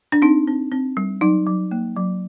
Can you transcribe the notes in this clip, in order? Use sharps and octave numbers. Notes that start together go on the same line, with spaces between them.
D4
C4 D#4
C4
C4
G3
F#3 D#4
F#3
A#3
F#3